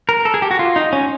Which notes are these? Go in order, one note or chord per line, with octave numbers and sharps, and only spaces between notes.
A#4
A4
G#4
G4
F#4
F4
D#4
C#4